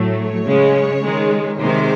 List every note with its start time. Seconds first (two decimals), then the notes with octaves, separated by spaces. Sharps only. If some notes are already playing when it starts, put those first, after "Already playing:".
Already playing: A2 F#3 A3
0.19 C#5
0.47 C#3 G#3
1.03 D#3 G#3
1.60 C3 D#3 G#3 C5